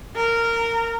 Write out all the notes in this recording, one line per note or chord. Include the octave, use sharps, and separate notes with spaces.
A#4